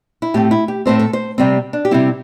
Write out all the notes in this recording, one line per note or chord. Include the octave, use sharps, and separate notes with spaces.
E4
A2 A3 C4 G4
E4
G4
A2 A3 C4 C5
A4
C5
C3 G3 C4
D4
G4
C3 G3 C4 E4